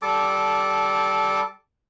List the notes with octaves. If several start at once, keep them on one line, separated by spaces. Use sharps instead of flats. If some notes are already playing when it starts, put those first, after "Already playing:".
G3 A4 A5 D6